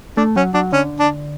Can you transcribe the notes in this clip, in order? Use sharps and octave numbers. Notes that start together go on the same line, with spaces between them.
A3 D4
F#3 C#4
F#3 D4
D3 C#4
D4